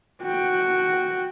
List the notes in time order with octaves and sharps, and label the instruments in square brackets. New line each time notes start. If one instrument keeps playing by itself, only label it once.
[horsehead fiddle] F#4 G5